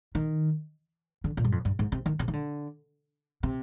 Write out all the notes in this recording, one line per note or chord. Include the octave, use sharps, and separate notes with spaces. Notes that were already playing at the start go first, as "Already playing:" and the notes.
D#3
D3
A#2
G2
F2
G2
G#2
C3
D#3
C3
D#3
D3
C3